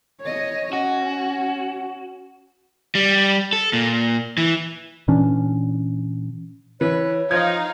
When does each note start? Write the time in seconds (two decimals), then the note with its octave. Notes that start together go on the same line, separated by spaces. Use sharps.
0.22 C#5 D#5
0.73 C#4 F#4
2.95 G3
3.53 A4
3.73 A#2
4.38 E3
5.08 A#2 E3 C#4 D4
6.81 E3 B4 C#5
7.31 F3 D#4 F5 G#6